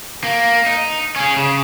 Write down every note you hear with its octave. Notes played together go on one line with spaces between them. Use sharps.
A#3
D#4
C#4 G#4
C#3